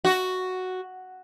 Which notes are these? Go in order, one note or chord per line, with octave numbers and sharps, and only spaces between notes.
F#4